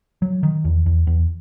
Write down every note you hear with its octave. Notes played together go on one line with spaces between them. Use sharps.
F#3
D#3
E2
E2
E2